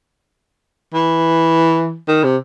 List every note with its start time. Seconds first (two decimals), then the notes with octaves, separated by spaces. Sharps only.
0.94 E3
2.08 D#3
2.24 C3